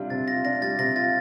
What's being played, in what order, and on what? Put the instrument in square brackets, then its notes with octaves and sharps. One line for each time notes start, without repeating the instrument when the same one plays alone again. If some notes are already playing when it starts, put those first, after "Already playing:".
Already playing: [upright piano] C3 G3 D4 F4
[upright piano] C3 [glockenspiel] A6
[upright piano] F4 [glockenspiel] A#6
[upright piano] D4 [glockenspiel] A#6
[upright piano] G3 [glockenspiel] A6
[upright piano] C3 [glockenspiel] A#6
[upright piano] F4 [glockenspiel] A6